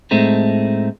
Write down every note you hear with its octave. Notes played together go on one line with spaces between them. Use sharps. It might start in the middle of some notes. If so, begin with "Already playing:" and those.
A2 G#3 A3 C4 D#4